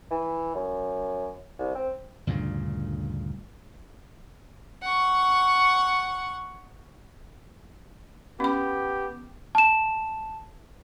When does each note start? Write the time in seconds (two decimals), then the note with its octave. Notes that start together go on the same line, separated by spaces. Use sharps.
0.11 E3
0.55 F#2
1.59 C2
1.75 C4
2.27 D2 G2 A#2 C#3
4.82 F#5 C#6
8.40 B3 C#4 G4 B5
9.55 A5 E7